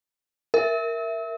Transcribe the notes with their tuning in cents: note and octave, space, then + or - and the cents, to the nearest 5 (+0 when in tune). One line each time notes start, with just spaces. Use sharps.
A#4 +0 E5 +0